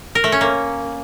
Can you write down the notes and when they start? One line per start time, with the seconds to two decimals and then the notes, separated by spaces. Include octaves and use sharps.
0.15 A#4
0.24 A3
0.32 C#4
0.41 A#3